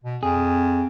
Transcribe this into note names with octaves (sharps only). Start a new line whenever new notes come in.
B2
F2 G#4